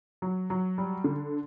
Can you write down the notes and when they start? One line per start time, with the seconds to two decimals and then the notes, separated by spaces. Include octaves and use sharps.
0.22 F#3
0.50 F#3
0.78 G3
1.04 D3